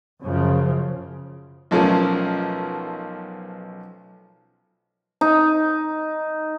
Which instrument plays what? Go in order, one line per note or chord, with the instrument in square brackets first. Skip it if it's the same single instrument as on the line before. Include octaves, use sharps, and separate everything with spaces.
[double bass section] F#2 C#3 F3
[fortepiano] B1 F3 A3 C#4 A#4
[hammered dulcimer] D#4